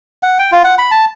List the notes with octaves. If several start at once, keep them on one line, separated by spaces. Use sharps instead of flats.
F#5
G5
F4
F#5
B5
A5